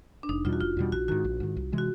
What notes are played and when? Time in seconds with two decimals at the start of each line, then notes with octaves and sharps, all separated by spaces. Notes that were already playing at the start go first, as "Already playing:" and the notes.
0.23 D4
0.29 F1 D#4
0.45 E2 B2 G3 F4
0.53 F#4
0.61 F1 F4
0.77 E2 B2 G3
0.92 A#1 F#4
1.08 G#2 D#3 F#4
1.24 A#1
1.40 G#2 D#3
1.57 C2
1.72 C3 E3 G#3
1.78 F#4